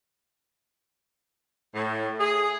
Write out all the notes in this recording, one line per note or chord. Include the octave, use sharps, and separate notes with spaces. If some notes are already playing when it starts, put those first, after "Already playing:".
A2
G#4